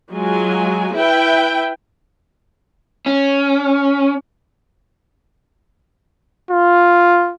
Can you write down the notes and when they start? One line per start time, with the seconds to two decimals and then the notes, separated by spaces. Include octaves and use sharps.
0.11 F#3 G#3 F4 G#5
0.95 E4 B4 E5 G5
3.06 C#4
6.51 F4